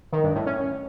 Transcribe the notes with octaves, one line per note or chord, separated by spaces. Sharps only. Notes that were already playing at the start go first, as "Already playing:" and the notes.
D#3
G2
A2
C#4